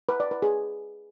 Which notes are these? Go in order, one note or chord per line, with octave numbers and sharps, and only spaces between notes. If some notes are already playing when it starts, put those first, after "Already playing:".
B4
D5
B4
G#4